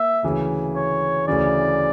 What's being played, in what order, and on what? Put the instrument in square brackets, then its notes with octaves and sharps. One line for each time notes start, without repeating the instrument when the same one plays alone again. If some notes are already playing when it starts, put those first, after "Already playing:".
Already playing: [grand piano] A#3 [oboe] E5
[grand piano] D2 C#3 E3
[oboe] C#5
[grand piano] D2 C#3 E3 [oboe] D5